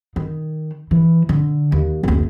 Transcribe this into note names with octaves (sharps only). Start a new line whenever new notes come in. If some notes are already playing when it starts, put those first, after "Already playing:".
D#3
E3
D3
D#2
F#1 D2